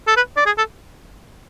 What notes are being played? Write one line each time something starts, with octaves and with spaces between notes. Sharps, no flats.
A4
B4
D5
G#4
A4